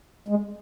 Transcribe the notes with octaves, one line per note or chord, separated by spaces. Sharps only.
G#3